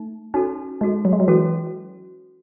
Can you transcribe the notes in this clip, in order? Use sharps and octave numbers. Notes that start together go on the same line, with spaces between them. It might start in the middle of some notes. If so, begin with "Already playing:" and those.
Already playing: A3 D#4
C#4 D#4 F#4 A4
G#3 D#4 F#4 A4
F#3
G#3
F#3
E3 C#4 F#4 A4